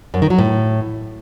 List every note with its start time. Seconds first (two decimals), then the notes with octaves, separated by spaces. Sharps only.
0.14 F#2
0.22 D#3
0.30 F#3
0.39 A2